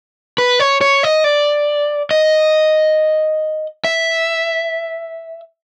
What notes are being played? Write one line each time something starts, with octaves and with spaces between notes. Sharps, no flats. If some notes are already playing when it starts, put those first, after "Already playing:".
B4
C#5
C#5
D#5
D5
D#5
E5